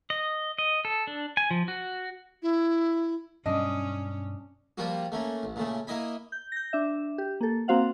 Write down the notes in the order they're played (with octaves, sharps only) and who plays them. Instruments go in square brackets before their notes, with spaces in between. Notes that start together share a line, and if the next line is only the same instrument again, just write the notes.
[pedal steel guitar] D#5
D#5
A4
D4
G#5
F3
F#4
[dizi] E4
[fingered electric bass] G2 B2 F#3 [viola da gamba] C#4 [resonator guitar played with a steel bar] D4 D#5
[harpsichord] F3 G3 A#3 F4 F#4
A3 A#3 C#4
A1
A#2 C#3 A3
A#3 E4 D#5 G#5 B5
[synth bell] G6
G6 A#6
D4 E5
G4
A#3 A4
A#3 C4 F#4 C5 F5 F#5